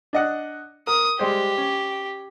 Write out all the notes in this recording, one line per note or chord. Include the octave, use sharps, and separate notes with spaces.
D4 D#5 F#5
A#4 D#6
G3 G#3 G4 C5
C#4